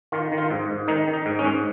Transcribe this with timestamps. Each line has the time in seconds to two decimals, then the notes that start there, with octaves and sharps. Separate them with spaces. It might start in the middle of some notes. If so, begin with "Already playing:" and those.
0.12 D#3 F4
0.32 D#3
0.38 F4
0.50 G#2
0.69 G#2
0.88 D#3 D#4
1.08 D#3
1.13 D#4
1.26 G#2
1.39 C#4
1.44 G#2